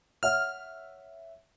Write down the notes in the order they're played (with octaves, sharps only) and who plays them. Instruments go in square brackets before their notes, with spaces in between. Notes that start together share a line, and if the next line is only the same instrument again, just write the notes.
[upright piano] C#5 E5 F#5 [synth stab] F6